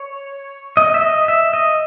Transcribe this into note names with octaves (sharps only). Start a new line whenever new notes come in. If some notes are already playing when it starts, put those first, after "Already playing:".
Already playing: C#5
D#5
E5
D#5
E5
D#5